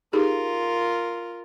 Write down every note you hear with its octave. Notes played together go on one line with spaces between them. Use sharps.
D#4 F4 G4 G#4 A#4